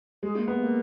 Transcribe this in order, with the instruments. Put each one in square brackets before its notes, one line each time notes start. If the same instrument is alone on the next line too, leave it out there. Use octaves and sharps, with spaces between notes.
[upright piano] G#3 [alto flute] G#4
[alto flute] A#3
[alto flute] A#3 [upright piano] B3
[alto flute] A#3